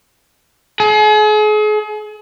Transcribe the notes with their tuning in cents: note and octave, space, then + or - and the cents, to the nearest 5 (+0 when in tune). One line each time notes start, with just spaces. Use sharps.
G#4 +40